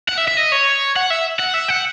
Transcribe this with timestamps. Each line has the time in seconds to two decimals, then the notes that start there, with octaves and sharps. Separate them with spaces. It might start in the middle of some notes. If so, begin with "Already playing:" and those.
0.09 F#5
0.17 E5
0.28 E5
0.37 D#5
0.52 C#5
0.96 F#5
1.10 E5
1.40 F#5
1.54 E5
1.69 F#5